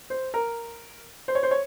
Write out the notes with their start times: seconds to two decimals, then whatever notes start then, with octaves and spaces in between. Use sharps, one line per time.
0.10 C5
0.34 A#4
1.28 C5
1.35 C#5
1.43 C5
1.51 C#5